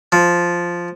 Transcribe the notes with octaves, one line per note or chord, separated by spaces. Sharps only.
F3